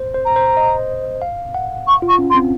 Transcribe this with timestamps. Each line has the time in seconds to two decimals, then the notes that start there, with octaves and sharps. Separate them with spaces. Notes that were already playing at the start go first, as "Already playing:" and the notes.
Already playing: C5
0.14 C5
0.25 A#5
0.36 C5
0.57 D#5
1.22 F5
1.54 F#5
1.87 C#6
2.02 F4
2.08 C#6
2.19 C#4
2.30 C6
2.35 C4